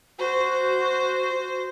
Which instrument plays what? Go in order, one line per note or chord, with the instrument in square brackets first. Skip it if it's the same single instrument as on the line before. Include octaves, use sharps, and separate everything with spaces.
[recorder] F#4 [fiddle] C5